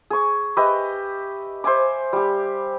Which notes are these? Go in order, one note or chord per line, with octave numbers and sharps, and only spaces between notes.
G#4 C#6
G4 B4 D#5 E5
C5 E5 G#5 D6
G3 G4